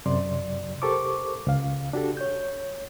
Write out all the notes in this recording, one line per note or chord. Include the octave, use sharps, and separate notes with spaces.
F#2 C3 F#3 D5 C6
G4 A4 A#4 C5 C#6 D6
C#2 F5
D4 F#4 G4 A4
C#5 G6